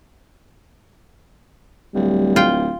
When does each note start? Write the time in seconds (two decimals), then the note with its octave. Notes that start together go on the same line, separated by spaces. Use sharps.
1.94 D1 G3
2.36 F4 G5